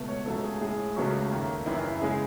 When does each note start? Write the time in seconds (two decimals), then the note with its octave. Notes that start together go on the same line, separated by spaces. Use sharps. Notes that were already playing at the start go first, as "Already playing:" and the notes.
Already playing: C#2 B2 A3
0.08 C#5
0.26 C#2 C#3 F#3 A3 A4
0.43 G#4
0.61 A2 G#3 G#4
0.96 C#2 C#3 F#3 A3 F#4
1.32 D#2 D#3 A3
1.66 F#2 C#3 E3 E4
1.84 E4
2.01 C#3 G#3 G#4